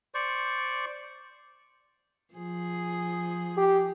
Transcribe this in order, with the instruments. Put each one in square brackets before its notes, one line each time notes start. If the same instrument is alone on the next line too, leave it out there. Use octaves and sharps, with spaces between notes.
[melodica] C5 D5 C#6
[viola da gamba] F3 G#4
[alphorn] G4